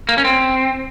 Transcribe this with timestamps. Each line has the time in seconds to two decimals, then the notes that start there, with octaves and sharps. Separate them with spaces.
0.09 A#3
0.18 C#4
0.25 C4